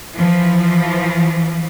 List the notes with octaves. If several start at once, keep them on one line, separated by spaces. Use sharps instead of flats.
E3 F3